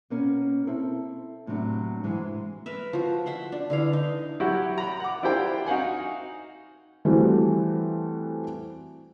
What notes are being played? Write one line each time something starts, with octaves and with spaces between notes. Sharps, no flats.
B2 A#3 C#4
C4 E4 A4
D#2 A2 C3 F#3 D4
G#2 E3 F#3 G#3
A#4 B4 E5
F3 F#4
E5 F#5 C6
D4
D3 E3 F5
D#4
F#3 E4 F#4 G4
A#5 B5
F#5 D6
D4 E4 F4 G4 C5 G5
D#4 F#4 F5 F#5 G#5
E3 G3 A3 C4 E4 F#4